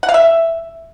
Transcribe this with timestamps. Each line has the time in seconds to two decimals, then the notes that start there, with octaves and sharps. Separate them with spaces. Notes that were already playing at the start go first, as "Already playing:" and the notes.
0.03 F#5
0.09 F5
0.14 E5